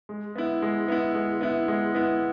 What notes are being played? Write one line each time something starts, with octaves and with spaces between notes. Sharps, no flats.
G#3
B3 E4
G#3
B3 E4
G#3
B3 E4
G#3
B3 E4